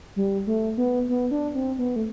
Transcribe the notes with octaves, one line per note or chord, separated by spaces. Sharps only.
G3
A3
B3
B3
D4
C4
B3
A3